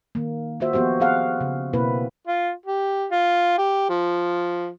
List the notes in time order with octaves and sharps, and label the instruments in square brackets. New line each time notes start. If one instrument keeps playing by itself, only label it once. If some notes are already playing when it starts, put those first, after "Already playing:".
[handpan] D#3 A#3
A#3 F4 F#4 C5 E5
F3 B3 F#4 G4 C5
C4 G#4 F5 F#5
C#3
B2 A#3 C4 E4 B4
[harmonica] F4
G4
F4
G4
F3